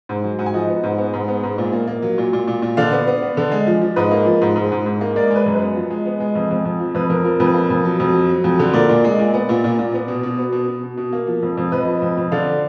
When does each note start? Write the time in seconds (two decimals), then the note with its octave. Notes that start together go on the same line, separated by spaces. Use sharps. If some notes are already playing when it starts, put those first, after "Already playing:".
0.09 G#2
0.24 F#3
0.39 G#2 F#5
0.46 G#5
0.53 F3 D#5 F#5
0.69 B3
0.83 G#2
0.98 B3
1.13 G#2
1.28 B3
1.43 G#2
1.58 A#2
1.73 A#3
1.87 A#3
2.02 F#3
2.18 A#2
2.33 A#2
2.48 A#2
2.62 A#2
2.77 D3 D5 F5
2.92 B3
3.07 B3
3.22 B3
3.37 D3
3.51 G#3
3.67 F3
3.82 F3
3.96 G#2 B4 D#5
4.11 A#3
4.26 F3
4.42 G#2
4.56 G#2
4.72 G#2
4.86 G#2
5.01 A#3
5.16 G#3 A#4 D5
5.30 G#3
5.36 B4
5.46 F#2
5.55 B4
5.61 B3
5.76 F3
5.90 G#3
6.05 B3
6.20 G#3
6.35 F2
6.51 F2
6.65 F2
6.80 F3
6.95 F2 B4
7.10 F2 A#4
7.24 F3 A#4
7.40 F2 B4
7.54 A#3
7.70 F2
7.85 F#3
8.00 F2
8.14 F#3
8.29 F#3
8.44 F2
8.59 D3
8.73 A#2 A#4 D5
8.89 A#2
9.04 G#3
9.19 A#2
9.34 B3
9.49 A#2
9.64 A#2
9.79 A#2
9.94 B3
10.08 B2
10.23 B2
10.38 B3
10.52 B2
10.68 B2
10.83 B2
10.97 B2
11.13 A#3
11.27 F3
11.43 F2
11.57 F2
11.72 F2 B4 D#5
11.87 F3
12.02 F2
12.17 F2
12.32 D3 D5 F5